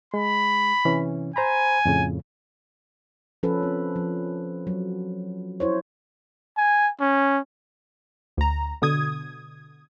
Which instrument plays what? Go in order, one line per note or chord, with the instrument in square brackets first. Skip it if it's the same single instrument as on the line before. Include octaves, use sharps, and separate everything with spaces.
[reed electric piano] G#3 [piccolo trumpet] B5
[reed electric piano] C3 E3 C#4
[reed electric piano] C5 A#5 B5 [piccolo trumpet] G#5
[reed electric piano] F2 A2 C#3
[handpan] F3 C#4 A4 B4
C4
F3
F#3
E4 C5 C#5
[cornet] G#5
C#4
[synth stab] D2 A#5
B2 D3 D#6 G#6